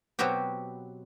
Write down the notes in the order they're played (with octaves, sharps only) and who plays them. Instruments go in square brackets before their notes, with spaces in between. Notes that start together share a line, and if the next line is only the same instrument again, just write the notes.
[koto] B2 F#3 B3 C4 F#4 G4